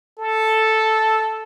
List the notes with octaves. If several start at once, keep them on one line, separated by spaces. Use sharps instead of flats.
A4